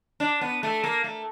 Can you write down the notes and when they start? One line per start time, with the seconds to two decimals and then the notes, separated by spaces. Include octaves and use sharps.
0.20 D4
0.41 B3
0.63 A3
0.84 A#3
1.04 A3